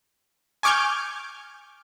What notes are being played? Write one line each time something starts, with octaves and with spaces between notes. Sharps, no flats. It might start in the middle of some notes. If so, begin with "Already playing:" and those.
G#5 C#6 D6 F6 G6 G#6